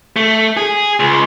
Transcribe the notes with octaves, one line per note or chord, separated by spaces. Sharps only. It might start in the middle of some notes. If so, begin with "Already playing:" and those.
A3
G#4
C#2